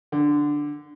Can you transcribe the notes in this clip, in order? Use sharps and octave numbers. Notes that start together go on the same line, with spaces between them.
D3